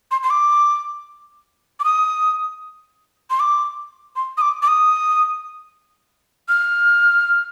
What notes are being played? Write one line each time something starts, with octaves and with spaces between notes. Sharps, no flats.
C6
C6
D6
D6
D#6
C6
D6
C6
D#6
D6
D6
D#6
F6